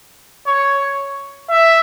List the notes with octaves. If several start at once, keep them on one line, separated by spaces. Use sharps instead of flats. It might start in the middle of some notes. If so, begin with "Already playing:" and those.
C#5
E5